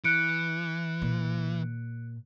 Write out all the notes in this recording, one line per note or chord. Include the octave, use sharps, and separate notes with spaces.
E3 F#6 C#7 D7
A#2